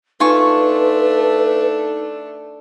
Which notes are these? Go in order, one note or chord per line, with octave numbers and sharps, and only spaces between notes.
A3 D4 D#4 F4 B4 G#5 C#6